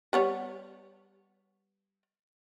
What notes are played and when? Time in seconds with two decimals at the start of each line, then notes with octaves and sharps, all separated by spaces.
0.13 G3 B3 C#5